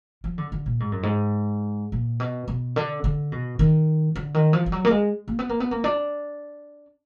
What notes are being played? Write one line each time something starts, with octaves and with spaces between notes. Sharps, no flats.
F3
D3
D3
A#2
G#2
F#2
G#2
A#2
B2
B2
D3
D3
B2
D#3
D3
D#3
F3
F3
F#3
A#3
G#3
A#3
B3
A#3
B3
A#3
D4